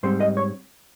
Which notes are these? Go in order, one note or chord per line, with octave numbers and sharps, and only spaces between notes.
G#2 G3 C4 C5
D#5
C#5